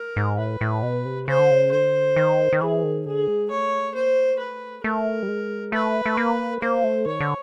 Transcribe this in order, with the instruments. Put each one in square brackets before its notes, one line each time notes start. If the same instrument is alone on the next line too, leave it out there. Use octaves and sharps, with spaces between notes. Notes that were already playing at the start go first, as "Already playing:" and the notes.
Already playing: [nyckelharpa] A#4
[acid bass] G#2
[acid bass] A2 [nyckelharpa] B4
[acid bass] A2
B2
C3
[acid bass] C#3 [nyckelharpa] C5
[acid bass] D3
C#3
[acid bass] D3 [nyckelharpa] C5
[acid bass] D#3
D#3
[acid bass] E3 [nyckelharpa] G#4
[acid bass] D#3
[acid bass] D3 [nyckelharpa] G#4
[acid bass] G#3
[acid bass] A3 [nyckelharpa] C#5
[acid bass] A#3 [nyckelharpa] C5
[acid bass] A3 [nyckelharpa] B4
[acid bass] A3 [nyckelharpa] A#4
[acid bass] G3
G#3
[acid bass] A3 [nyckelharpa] B4
[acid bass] A3
A#3
[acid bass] A#3 [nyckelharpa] C5
[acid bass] A3
[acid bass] D#3 [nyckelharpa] C#5
[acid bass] D3